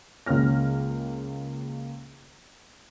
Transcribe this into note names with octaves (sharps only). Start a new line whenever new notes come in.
C#2 A#3 C#4 F6 A#6